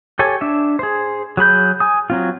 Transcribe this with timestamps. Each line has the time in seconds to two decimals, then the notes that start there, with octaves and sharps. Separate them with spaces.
0.19 G4 A4 C#5 G#5
0.41 D4 E5
0.79 G#4 C5
1.37 F#3 G#4 B5 G6
1.80 G#5 D#6
2.10 F#3 C4 F4